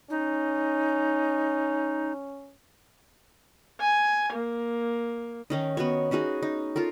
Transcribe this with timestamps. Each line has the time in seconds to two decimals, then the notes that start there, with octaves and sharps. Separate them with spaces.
0.10 C#4 D#4
3.81 G#5
4.33 A#3
5.50 D#3 C#4 D#4
5.77 B3 F#4 C#5
6.11 C#4 D#4 F#4 G#4
6.42 D#4
6.76 F4 A4 A#4